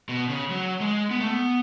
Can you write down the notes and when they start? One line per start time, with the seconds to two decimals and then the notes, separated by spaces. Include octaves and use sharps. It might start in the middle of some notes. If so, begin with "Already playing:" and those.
0.09 B2
0.29 C#3
0.50 F#3
0.81 G#3
1.11 B3
1.21 A3
1.30 B3